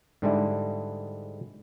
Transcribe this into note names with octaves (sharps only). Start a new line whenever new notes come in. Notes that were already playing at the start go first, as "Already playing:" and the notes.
G#2 D3 G3 G#3 D4 E4